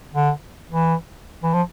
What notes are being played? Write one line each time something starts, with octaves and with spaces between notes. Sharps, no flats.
D3
E3
E3
F3